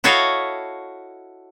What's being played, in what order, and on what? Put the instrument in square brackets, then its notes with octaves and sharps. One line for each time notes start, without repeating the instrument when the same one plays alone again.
[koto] E4 F#4 A4 C#5 D#5 F5